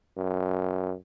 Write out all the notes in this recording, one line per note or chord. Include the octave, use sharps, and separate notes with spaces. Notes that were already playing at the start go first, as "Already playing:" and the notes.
F#2